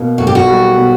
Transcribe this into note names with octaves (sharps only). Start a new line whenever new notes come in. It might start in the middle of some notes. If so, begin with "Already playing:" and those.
Already playing: B2 A#3
B1 F#4
G4
F#4
G3
B2